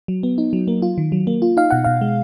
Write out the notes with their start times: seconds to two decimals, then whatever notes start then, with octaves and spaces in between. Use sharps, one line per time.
0.08 F#3
0.23 B3
0.38 D#4
0.53 F#3
0.68 A#3
0.82 F4
0.98 D#3
1.12 F#3
1.27 A#3
1.42 F4
1.57 D#4 F5
1.71 B2 F#5
1.84 B2 F5
2.01 G#3